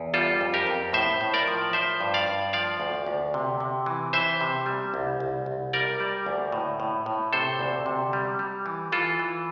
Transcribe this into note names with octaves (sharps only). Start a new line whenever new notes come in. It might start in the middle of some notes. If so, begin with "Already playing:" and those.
Already playing: E2
G3 F4 A4
F2
G4 A#4
F2
A2 C5 E5
A2
A#4 D5
F3
F3 C5 E5
G2
D5 F5
G2
F3 D5 F5
D2
D2
C3
C3
E3
E3 C5 E5
C3
G3
C2
C2
C2
G3 A#4 D5
G3
D2
A2
A2
A2
C3 A4 C5
D2
C3
G3
G3
E3
E3 F4 A4
E3